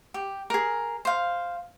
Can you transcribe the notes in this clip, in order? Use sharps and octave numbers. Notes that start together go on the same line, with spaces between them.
G4
G#4 A#4
C5 F5